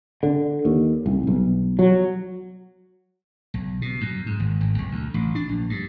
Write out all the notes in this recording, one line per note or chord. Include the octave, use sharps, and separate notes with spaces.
D3
D#2
C2
B1
F#3
B1
B2
F#2
G#2
G#1
G#1
B1
D2
A1
D4
A#1
G2